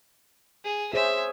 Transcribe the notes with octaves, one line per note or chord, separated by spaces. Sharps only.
G#4
G#4 C5 C#5 E5